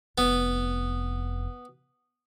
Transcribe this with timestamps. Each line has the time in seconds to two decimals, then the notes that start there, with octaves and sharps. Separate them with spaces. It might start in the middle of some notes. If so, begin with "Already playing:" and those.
0.18 F1 B3